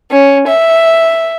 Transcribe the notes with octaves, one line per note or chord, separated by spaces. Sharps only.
C#4
E5